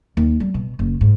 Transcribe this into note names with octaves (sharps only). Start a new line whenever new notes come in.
D#2
G3
B2
F#1
G#2